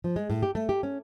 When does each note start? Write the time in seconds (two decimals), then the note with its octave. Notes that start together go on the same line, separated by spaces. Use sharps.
0.04 F3
0.16 G#3
0.30 A2
0.43 G4
0.55 A3
0.69 G4
0.83 C#4